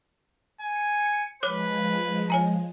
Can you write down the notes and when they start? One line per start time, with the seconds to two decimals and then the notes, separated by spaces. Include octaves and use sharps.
0.61 G#5 C#7
1.43 F3 G#3 B4 C#5 D6 F#6
2.30 C#5 G#5 A#5